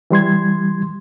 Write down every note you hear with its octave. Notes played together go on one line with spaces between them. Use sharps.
E3 G3 C6 G#6